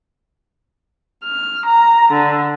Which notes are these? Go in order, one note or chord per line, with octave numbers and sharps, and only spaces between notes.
F6
A#5
D3